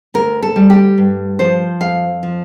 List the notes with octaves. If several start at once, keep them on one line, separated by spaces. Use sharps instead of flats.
D2 A#4
A4
G3
G4
G2
F3 C5
F2 F5
F3